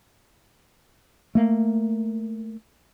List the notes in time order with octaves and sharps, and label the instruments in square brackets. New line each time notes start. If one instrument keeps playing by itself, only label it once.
[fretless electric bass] A3 A#3